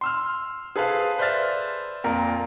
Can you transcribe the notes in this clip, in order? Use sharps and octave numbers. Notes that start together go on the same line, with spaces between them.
C6 E6 F6
G#4 A4 B4 C5 F5
B4 C5 D5 E5 F6 A6
F2 A#2 F4 A#4 A#5